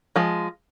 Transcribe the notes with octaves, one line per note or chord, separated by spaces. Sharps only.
F3 G#3